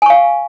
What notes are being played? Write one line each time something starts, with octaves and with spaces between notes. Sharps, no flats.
F5 G#5 C#6